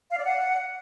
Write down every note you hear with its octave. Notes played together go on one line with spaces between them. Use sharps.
F5
D5
F#5